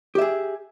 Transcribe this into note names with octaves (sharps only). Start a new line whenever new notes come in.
G4 G#4 E5